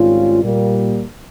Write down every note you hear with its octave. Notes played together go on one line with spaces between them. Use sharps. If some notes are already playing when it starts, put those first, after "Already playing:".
Already playing: G#1 G#2 G3 C#4 F4
A#2 G3 A#3